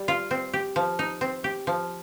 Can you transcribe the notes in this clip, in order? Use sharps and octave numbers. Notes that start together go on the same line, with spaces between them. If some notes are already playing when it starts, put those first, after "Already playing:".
Already playing: G3
F4
C4
G4
F3
D#4
C4
G4
F3